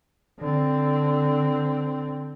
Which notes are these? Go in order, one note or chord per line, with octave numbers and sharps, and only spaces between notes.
D3 C4